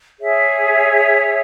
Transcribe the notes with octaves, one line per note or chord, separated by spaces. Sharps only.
G#4 C#5 E5